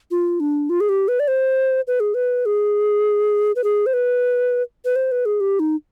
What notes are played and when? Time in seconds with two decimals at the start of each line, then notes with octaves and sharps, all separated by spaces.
0.11 F4
0.40 D4
0.70 F4
0.80 G#4
0.89 G4
1.08 B4
1.20 D5
1.28 C5
1.87 B4
2.00 G#4
2.14 B4
2.46 G#4
3.56 B4
3.64 G#4
3.86 C5
3.93 B4
4.85 B4
4.96 C5
5.12 B4
5.26 G#4
5.40 G4
5.60 D#4